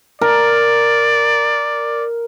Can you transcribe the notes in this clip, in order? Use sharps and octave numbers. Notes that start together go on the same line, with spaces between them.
A#4 D5